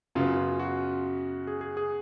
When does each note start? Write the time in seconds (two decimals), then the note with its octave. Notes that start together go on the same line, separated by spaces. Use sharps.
0.15 F#2 C#3 F#3 B3 F4
0.37 F4
0.59 F#4
1.47 G#4
1.61 G#4
1.77 G#4